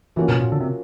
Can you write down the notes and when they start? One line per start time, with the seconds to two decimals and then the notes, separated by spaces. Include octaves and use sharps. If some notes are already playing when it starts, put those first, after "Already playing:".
0.16 E3 F3 A#3 C#4 F#4 A#4
0.29 B2
0.41 A#2
0.52 D3
0.60 C3